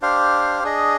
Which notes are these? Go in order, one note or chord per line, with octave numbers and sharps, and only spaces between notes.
D4 G4 C5 F5
D4 G#4 D#5